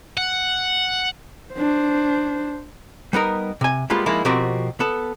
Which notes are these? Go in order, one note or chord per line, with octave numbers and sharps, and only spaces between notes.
F#5
D4 C5
G3 B3 D#4 A#4
C3 G#5
G3 G#3 A#3 B3 F4
F3 G#3 A#3 D#4 E4
B2 F3 C4 F#4 G4 A#4
B3 A4